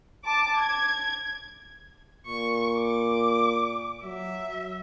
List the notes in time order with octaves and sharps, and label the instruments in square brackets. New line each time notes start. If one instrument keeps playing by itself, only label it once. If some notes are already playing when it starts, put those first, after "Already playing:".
[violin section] A5 D6
G#6
[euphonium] A#2 [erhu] C#6
[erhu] D6
[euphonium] F#3 [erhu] E5